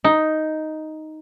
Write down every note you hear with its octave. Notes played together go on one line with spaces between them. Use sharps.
D#4